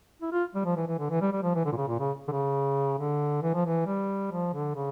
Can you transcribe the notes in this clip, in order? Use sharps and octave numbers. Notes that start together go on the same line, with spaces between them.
E4
F4
G3
F3
E3
E3
D3
E3
G3
G3
F3
E3
D3
A#2
C#3
A#2
C#3
D3
C#3
D3
E3
F3
E3
G3
F3
D3
C#3